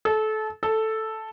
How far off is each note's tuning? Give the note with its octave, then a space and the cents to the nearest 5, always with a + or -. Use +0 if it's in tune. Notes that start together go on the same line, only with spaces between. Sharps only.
A4 -25
A4 +0